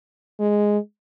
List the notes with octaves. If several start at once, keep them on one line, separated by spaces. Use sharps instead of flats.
G#3